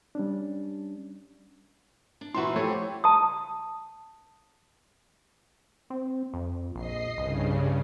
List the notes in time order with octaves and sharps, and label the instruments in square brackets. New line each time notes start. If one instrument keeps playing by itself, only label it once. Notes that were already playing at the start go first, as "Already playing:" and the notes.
[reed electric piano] G3 C#4 D4
[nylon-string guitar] D4
[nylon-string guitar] A#2 E3 F#4 [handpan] E4 [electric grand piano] C6
[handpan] F3 G4 [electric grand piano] A3 [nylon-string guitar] C#5
[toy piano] A5 D#6
[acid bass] C4
F2
[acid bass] A#1 [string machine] D#5 C7
[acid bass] C2 [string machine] G2 C#3